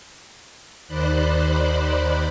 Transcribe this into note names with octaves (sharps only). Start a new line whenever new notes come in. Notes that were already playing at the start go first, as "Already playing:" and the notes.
D#2 D#3 C5 D5 B5 F#6